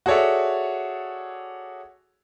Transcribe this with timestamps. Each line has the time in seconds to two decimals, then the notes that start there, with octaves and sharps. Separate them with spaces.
0.06 F#4 G#4 A4 C#5 D5 E5